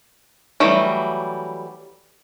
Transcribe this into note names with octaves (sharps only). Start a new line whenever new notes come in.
E3 F#3 G3 A3